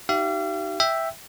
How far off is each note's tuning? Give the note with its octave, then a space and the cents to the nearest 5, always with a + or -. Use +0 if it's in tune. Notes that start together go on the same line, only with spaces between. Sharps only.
D#4 +0 G4 -35 F5 -45
E5 +0 G5 +0